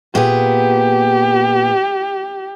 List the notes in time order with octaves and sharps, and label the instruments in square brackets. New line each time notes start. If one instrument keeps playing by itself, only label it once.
[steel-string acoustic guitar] A#2 B3 G#4 [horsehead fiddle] G4